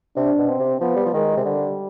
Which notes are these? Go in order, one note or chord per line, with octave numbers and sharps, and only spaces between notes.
C3 D4
B2
C4
C3
F3 B3
G3
F3
D#3 G#3
C3
D3 G3